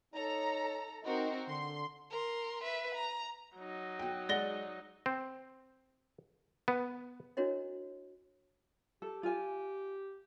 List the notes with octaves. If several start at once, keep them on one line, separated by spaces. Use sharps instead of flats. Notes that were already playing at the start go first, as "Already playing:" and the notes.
D#4 A4 C#5 A#5
C4 D#4 F#4 A#4
D3 C6
A#4 C6
B4 E5
A#5
F#3 D#4
F#4 G5
G#3 D5 F#5 A#6 G7
C4
B3
D4 E4 F#4 A#4 C#5 D#5
G4 A4
F4 G4 G#5